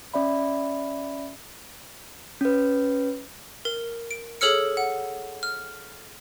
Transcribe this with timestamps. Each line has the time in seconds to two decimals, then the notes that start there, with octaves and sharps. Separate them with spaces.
0.14 C#4 D5 E5 B5
2.41 C#4 B4
3.65 A#4
4.11 D7
4.41 G#4 A4 C#5 E6 F6 C#7
4.77 F#5
5.43 F6